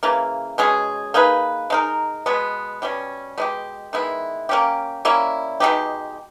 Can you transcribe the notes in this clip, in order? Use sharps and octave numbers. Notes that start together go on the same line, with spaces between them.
C#3 E3 A#3
B2 G#3 C#4 G#4
A#3 D#4 G#4 B4
G#3 D#4 A#4
B2 G#3 B3
B2 G3 C#4
B2 G#3 D#4 G4
D#3 G#3 B3 E4
A#3 C#4 G4
G3 A#3 C#4 E4
B2 G#3 D#4 G4